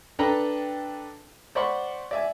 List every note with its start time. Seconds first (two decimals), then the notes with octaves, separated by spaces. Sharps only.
0.19 D4 A4 B4 G5 A#5 B5
1.55 C5 D5 F#5 B5 C#6
2.11 D5 E5 G#5